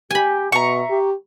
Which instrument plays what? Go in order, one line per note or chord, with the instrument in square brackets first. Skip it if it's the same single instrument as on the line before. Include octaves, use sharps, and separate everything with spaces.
[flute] G4 [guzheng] G#5 B5
[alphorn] B2 [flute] E5 [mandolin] A#5 C#6
[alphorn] G4